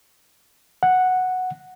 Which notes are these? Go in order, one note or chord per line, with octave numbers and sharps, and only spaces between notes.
F#5